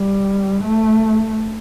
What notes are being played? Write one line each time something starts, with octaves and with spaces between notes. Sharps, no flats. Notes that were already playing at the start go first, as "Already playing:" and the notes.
Already playing: G3
A3